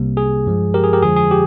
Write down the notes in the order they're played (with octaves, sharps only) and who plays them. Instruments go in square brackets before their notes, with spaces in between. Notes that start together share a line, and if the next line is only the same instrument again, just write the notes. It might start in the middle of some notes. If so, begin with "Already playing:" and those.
Already playing: [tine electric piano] C2 C3 G3 A#3
G#4
G2 F3 G#3
G4 A#4
G#4
G4 A#4
F2 D3 F3 G#3 G#4
G#4
G4